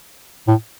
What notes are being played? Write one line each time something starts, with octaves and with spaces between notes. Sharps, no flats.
A2